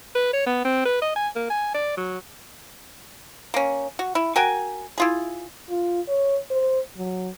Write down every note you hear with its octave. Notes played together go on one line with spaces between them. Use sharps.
B4
C#5
B3
C4
B4
D#5
G#5
A#3
G#5
D5
F#3
A#3 C#4
F#4
E4
F#4 A#4 G5 G#5
E4 F4 G#4
F4
C#5
C5
F#3